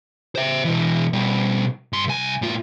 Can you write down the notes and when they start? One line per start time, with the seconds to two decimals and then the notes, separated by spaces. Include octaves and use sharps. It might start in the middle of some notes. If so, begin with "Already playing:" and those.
0.36 C5 E5
0.65 B2 E3
1.13 B2 G3
1.93 G2 C6
2.08 C2 G#5
2.42 A2 F4